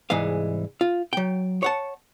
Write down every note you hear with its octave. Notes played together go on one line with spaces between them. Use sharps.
C2 G#2 E3 G#3 G#4 F5
F4
F#3 G5
C#5 F#5 A5